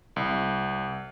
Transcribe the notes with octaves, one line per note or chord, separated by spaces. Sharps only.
C2